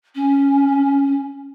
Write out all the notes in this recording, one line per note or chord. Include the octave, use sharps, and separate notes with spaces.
C#4